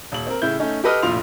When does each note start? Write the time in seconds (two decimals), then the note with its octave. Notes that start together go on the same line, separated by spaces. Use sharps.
0.12 D#1 F#7
0.27 C4 A#4
0.42 A2 C#3 E4 G6
0.60 A3 C#4 D#4
0.84 G4 A4 B4 D#5 D#6 F6
1.02 F1 A#1 A2 F4 C6 F7